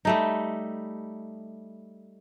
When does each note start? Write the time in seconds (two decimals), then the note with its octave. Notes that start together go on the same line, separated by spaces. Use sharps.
0.05 G3 A3 D#4